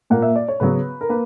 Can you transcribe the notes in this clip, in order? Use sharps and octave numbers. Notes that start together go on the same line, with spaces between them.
A#2 A#3 F#5
E5
D5
C#5
C#3 F#3 B3 B4
A#4
A#3 B4